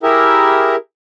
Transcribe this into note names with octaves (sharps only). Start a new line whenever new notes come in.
E4 G4 G#4 A#4 E5